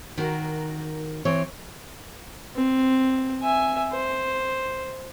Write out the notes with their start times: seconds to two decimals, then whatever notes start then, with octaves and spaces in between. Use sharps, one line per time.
0.17 D#3 F#4 A#4
1.25 E3 C4 C#5
2.56 C4
3.42 E5 G#5
3.92 C5